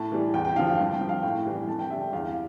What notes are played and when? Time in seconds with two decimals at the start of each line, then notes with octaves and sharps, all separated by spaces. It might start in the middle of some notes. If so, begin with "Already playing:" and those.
Already playing: A2 A5
0.12 E3 G3
0.34 E2 G5
0.45 G5
0.56 D3 F5
0.59 F3
0.67 G5
0.79 G2
0.93 G5
1.01 F3
1.09 F5
1.23 A2 G5
1.46 E3 G3
1.68 F2 A5
1.79 G5
1.90 D3 E5
1.93 G3
2.01 G5
2.13 E2 F5